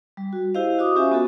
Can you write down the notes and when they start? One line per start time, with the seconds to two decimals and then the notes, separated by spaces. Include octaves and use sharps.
0.17 G3
0.33 F#4
0.55 E4 G4 C5 D#5 F5
0.79 F#4 D#5 D6 D#6
0.96 C#4 F4 G4 C5 E5 G#5
1.11 B3 F#4 A4